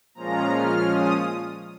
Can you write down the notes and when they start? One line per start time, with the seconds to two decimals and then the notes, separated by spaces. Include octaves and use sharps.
0.15 A#2 F3 G#3 C#4 F4 A#5
0.50 F6
0.85 D#6